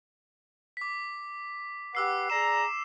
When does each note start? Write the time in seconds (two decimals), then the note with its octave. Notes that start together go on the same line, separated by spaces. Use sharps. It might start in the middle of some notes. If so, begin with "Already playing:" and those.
0.77 D6 B6
1.95 G4 B4 F#5 D6 E6 C7
2.30 G#4 D5 A#5 E7